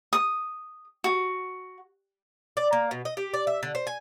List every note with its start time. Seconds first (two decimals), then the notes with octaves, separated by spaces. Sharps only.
0.13 D#6
1.04 F#4
2.57 D5
2.73 A#3
2.91 B2
3.05 D#5
3.17 G4
3.34 D5
3.47 E5
3.63 D3
3.75 C5
3.87 G#5